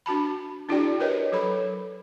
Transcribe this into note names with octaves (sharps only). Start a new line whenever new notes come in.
D4 F#4 A5 B5
D4 E4 F#4 G#4 D5 G5
G4 A#4 B4 C#5 D#5
F#3 A4 C#5 B5